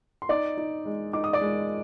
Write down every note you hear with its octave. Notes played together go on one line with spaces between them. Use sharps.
C6
D#4 D5 D6
D#4
G#3
D#4 D6
D#6
D5 D6
G#3